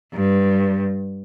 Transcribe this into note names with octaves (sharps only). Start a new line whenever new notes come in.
G2